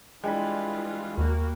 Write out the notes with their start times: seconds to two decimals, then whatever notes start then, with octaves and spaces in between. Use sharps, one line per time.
0.24 E3 G3 G#3 D4 F4 G#4 B5
1.18 D#2 A#3 F#4